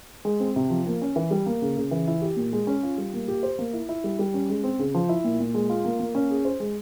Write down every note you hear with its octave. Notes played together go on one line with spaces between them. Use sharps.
G#3
C4
C3
F3
A#3
C#4
E3
G3
A#3
C#3
C#3
E3
E4
G4
A#2
G#3
C#4
F4
G3
A#3
G4
C5
A#3
E4
E4
G3
G3
C#4
G#3
C4
C#3
F3
E4
A#2
A#2
G#3
F4
A#3
A#3
C#4
G#4
C5
G#3